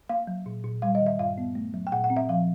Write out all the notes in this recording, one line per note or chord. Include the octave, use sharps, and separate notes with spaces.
A#3 F5
F#3
A#2
A#2
G3 F5
D#5
D#3
E5
G2 F5
B3
A3
F#3
G5
A#2 F#5
F#5
C4
E5
F3 F5